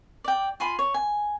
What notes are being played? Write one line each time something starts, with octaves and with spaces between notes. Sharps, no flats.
D5 G5
F4 G#5 B5 C6
C#5
G#5